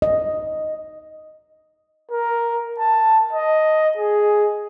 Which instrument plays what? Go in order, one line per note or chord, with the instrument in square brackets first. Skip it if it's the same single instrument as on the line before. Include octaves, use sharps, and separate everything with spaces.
[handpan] D#5
[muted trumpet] A#4
A5
D#5
G#4